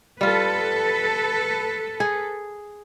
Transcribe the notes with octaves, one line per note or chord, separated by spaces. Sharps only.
G3 F4 A4 B4
G#4